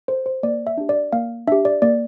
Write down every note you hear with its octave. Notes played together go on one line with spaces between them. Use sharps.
A4 C5
C5
A#3 D5
E5
D4 G4
D5
A#3 F5
D4 G4 E5
D5
A#3 D5